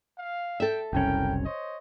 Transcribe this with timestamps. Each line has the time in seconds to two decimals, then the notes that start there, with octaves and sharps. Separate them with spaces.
0.18 F5
0.60 A4 E5 G5
0.93 F#1 C2 C#4 A#4 G5
1.45 C5 C#5 D#5